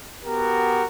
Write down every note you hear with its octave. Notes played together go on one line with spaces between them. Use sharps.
B3 F#4 G4 A#4